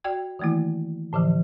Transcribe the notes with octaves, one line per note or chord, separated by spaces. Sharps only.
F#4 D5 G5 G#6
D#3 E3 A3 A#3 E4
A2 D3 E3 F3